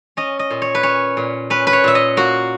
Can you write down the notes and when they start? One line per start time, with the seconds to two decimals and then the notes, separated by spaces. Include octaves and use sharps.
0.17 C#4 D#5
0.39 D#5
0.50 A#2
0.62 C#5
0.75 B4
0.83 C#4 C#5
1.17 A#2
1.50 C#4 B4
1.67 B4
1.73 C#5
1.84 A#2 E5
1.95 D#5
2.17 A#3 F#4